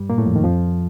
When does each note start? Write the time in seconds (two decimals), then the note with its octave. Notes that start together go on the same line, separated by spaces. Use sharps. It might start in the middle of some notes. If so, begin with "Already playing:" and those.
Already playing: G2 G3
0.10 A#2 A#3
0.18 A2 A3
0.27 F2 F3
0.36 D#3
0.44 F2 F3